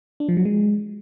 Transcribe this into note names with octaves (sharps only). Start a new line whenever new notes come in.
D4
F3
F#3
G#3